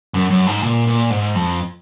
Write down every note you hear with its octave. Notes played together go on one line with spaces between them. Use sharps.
F#2
F#2
G#2
A#2
A#2
G#2
F2